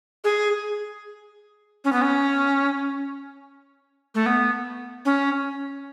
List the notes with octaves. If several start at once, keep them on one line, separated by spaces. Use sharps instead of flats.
G#4
C#4
B3
C#4
A3
B3
C#4